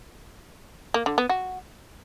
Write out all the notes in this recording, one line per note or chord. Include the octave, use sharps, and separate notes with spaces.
A#3
D3
B3
F#4